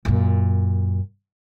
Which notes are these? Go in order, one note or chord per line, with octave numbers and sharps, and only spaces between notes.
F#2 A#2